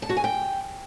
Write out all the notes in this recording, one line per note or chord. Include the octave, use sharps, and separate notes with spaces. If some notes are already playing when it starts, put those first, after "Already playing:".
A5
F#4
G#5
G5